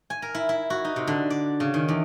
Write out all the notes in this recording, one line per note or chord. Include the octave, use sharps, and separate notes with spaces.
G#5
A#4
E4
E4
F#4
D#4
C3
D3
D5
C#3
D#3
E2